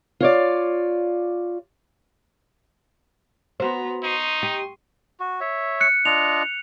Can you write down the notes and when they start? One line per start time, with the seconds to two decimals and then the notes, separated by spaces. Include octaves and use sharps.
0.20 F4 C#5 D5
3.60 B3 F#4 C5 A#5
4.03 D#4 C6 C#6 D#6
4.43 G4
5.20 F#4
5.40 C#5 E5
5.80 F#6 C#7
6.05 D4 F4 D#5 F7